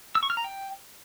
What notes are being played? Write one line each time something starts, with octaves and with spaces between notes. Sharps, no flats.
E6
C#6
F6
A#5
G5